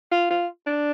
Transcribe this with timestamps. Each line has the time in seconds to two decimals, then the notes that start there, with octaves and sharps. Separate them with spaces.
0.12 F4
0.30 F4
0.67 D4